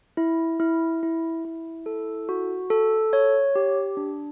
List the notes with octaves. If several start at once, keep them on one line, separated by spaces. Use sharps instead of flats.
E4
E4
E4
E4
A4
F#4
A4
C#5
G4
D4